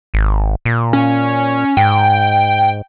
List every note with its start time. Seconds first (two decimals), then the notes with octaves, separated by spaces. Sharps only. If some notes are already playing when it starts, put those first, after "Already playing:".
0.14 G#1
0.65 A#2
0.93 C#4
1.77 G#2 G5